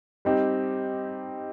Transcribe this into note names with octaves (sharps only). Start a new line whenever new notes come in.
G3 C4 D#4 G4